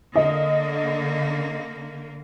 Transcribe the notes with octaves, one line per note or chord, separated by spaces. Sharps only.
D3 A#3 D#5